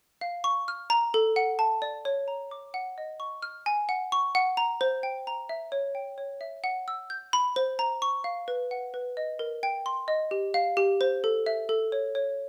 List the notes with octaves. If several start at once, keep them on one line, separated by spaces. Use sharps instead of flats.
F5
C#6
F6
A#5
A4
F#5
A5
D5
C#5
A#5
D6
F#5
D#5
C#6
F6
G#5
F#5
C#6
F#5
A#5
C5
G5
A#5
E5
C#5
G5
C#5
E5
F#5
E6
G6
B5
C5
A#5
C#6
F5
B4
F#5
B4
D#5
A#4
G5
C6
D#5
G4
F5
G4
C5
A4
E5
A4
C#5
C#5